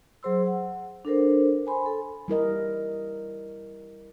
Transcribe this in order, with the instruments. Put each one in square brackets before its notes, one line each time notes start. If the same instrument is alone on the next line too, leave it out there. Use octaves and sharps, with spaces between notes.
[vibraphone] F#3 G#4 C5 C6 E6
F#5
D4 A4 A#4 C5
C5 G#5 B5 C6
A4
[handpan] G3 E4 A#4 D#5